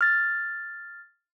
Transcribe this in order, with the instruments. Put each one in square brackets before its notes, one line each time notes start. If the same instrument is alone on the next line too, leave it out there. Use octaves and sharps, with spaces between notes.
[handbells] F6 A6